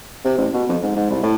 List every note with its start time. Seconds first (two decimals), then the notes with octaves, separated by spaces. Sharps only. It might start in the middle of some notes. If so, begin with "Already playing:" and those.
0.25 C3
0.38 A1
0.53 B2
0.69 F2
0.83 G#2
0.96 G#2
1.10 C2
1.23 A2